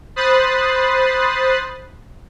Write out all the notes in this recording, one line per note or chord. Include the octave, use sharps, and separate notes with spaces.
C5 B5 D#6 F#6 A6 C7